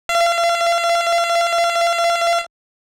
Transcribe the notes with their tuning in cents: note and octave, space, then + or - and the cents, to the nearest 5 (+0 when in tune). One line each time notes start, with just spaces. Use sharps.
F5 -40